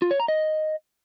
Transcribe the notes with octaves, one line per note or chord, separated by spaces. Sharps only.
F4
C#5
A#5
D#5